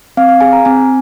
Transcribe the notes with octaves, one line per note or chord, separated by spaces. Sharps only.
C4 F5
F5
G#4 G#5
A#5
C4 G#5